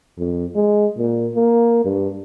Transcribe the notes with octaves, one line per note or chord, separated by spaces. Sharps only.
F2
G#3
A#2
A#3
G2